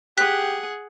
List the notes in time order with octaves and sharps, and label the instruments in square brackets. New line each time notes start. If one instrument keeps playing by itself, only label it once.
[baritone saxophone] G4 [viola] G#4 F#5 [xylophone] F#6 B6